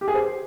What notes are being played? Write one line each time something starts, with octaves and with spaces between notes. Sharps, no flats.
G4
G#4
C5